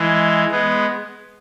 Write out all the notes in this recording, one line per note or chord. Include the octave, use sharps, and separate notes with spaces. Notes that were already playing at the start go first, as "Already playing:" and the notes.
Already playing: E3 G#3
G#3 B3